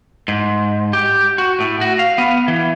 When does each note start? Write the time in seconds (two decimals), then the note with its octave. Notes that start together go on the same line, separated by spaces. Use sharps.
0.28 G#2
0.93 G4
1.38 F#4
1.60 A2
1.81 F#4
1.99 F5
2.18 B3
2.48 E3